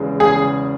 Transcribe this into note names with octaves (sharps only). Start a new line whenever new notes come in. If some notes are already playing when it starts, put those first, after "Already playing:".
Already playing: E2 C#3 G#3
E2 C#3 G#3 G#4